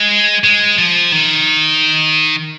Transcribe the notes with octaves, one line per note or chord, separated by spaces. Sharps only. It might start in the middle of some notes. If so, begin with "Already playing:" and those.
Already playing: G#3
G#3
F3
D#3